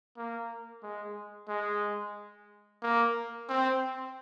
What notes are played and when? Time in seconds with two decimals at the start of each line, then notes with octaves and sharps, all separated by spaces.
0.17 A#3
0.82 G#3
1.49 G#3
2.82 A#3
3.49 C4